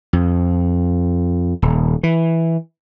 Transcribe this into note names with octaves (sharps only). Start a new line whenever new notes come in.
F2
D#1
E3